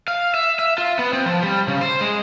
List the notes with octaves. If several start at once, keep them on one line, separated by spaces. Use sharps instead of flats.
F5
E5
E5
F4
B3
C4
F3
G3
C#3
C5
G#3